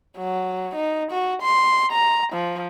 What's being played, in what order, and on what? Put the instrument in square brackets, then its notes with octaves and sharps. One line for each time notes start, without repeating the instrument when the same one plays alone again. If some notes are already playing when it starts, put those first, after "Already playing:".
[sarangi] F#3
D#4
F#4
C6
A#5
F3